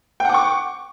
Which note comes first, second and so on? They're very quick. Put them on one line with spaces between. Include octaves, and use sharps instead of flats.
G5 F#5 D6 C#6